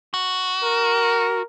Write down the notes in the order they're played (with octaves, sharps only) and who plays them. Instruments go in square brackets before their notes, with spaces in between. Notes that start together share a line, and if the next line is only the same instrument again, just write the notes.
[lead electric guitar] F#4
[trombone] A#4